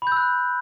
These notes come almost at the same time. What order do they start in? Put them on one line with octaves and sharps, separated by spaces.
B5 G6 E6 F#6